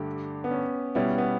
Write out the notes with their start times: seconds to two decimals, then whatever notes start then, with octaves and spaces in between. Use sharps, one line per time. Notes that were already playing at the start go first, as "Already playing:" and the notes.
Already playing: G2 D3 A3 G4
0.44 B3
0.51 C#4
0.95 B2 G3 B3 C#4 E4
1.18 B3